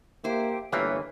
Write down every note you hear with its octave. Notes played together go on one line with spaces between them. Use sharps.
A#3 E4 G4 C5 E5 G5
G1 E3 A3 A#3 G4 C#5 F5 G#5